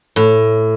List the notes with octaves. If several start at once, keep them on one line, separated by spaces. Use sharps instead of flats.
A2